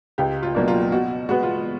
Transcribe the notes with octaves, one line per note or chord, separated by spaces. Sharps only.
C#2 G4
F4
B2 F#3 A#3 D4
F4
B2 F#4
G#3 B3 F#4
F4